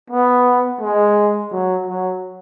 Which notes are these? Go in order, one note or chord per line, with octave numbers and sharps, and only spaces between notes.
B3
G#3
F#3
F#3